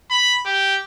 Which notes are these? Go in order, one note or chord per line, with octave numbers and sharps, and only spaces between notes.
B5
G4